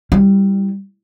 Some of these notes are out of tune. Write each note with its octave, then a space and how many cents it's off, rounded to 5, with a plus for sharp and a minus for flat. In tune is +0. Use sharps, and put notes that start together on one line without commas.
G3 +0 E4 +0